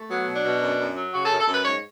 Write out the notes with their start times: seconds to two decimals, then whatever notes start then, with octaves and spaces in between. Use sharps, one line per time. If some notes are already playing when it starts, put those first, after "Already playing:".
Already playing: A3
0.09 F#3 B3
0.27 B2
0.36 D4
0.44 B2
0.62 F#2
0.79 F#2
0.95 F#3
1.13 C#3 F#4
1.22 G#4
1.26 A4
1.30 F#2
1.39 A4
1.47 F#2
1.53 B4
1.64 G#2 C#5